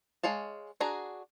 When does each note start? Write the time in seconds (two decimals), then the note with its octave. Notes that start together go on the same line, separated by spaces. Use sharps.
0.23 G#3 C#5 F5 A5
0.80 D4 F#4 G#4 A#5